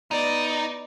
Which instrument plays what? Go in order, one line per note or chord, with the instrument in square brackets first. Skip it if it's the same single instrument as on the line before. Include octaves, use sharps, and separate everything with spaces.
[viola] B3 D5 [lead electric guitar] D#4